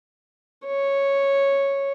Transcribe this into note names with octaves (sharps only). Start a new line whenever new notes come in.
C#5